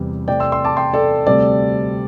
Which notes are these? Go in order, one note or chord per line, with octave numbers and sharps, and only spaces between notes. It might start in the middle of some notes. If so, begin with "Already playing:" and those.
Already playing: E2 C3 E3 G3
C3 E3 A3 D5 G5
C6 E6
C6 E6
A5 D6
G5 C6
A4 D5
D2 C3 G3 C4 A4 D5